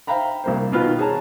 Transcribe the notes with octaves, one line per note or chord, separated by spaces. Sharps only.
C5 E5 F5 G5 A#5 B5
C2 A#3 C5
B2 D#3 F4 B4 F6
G#4 C#5 A5 A#5